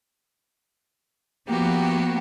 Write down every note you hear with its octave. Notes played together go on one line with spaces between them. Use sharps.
F3 A#3 B3 F#4 G4